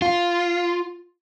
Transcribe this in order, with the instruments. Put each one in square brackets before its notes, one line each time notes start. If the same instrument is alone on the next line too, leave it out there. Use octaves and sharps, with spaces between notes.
[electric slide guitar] F4